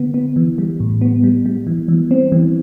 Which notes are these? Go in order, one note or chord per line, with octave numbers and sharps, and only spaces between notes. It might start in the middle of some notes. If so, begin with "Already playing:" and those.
Already playing: D3 B3
B3
E3
G3
A2
B3
G3
G3
E3
E3
C4
E3